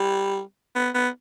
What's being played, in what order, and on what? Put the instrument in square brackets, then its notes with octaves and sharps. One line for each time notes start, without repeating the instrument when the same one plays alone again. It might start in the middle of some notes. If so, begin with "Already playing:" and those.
Already playing: [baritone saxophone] G3
B3
B3